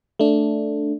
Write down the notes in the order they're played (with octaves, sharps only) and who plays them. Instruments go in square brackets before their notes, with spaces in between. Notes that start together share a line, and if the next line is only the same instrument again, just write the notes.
[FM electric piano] A3 D4